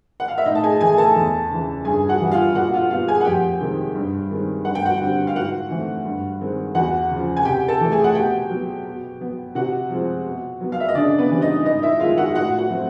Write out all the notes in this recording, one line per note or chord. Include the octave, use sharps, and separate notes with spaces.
F#5
F5
E5
A2 D#4 D#5
A5
G#4 G#5
E3 A3 G#4 G#5
A4 A5
E2
C#3 E3
G2 G#4 G#5
F#4 F#5
E3 G3
F4 F5
A#2 F#4 F#5
F4 F5
G3 B3 F4 F5
G#4 G#5
F#5
F2 G4 G5
C3 D#3 G#3 C4
G2
D#3 G#3 C4
G2 F#5
G5
F#4 F#5
D3 G3 C4
F5
G#2 F#4 F#5
E3 A3 C4
G2
D#3 G#3 C4
E2 F#4 F#5
C#3 F3
G#5
C3 G4 G5
A4 A5
E3 A3
G#4 G#5
F#5
B2 G4 G5
F#3 B3
B2
F#3 B3
C3 F#4 F#5
F3 G#3 C4
B2
F#3 B3
F5
E5
D#5
C#3 D4 D5
B3 B4
E3 G3 C4
D#4 D#5
G#2 D#4 D#5
E4 E5
D#3 G#3 F4 F5
F#4 F#5
A2 F#4 F#5
F#4 F#5
F#3 A3 C4